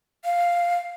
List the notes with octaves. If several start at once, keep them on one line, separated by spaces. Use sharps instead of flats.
F5